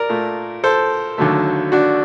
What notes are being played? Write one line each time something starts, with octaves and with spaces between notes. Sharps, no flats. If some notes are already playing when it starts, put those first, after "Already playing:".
Already playing: A#4 D5
A#2 A3
A4 C5
D#2 D3 F#3 A3
D4 F#4